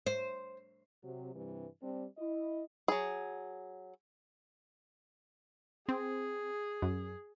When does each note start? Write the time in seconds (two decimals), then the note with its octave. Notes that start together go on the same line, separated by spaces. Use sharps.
0.06 C5
1.04 C3 F#3
1.35 G2 C3 E3 G3
1.83 G3 C4 D4
2.18 E4 D#5
2.88 F#3 G#4
5.89 C4 G#4
6.82 F#2